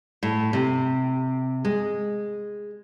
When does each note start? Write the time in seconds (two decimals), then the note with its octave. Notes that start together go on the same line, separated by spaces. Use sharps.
0.23 A2
0.53 C3
1.65 G#3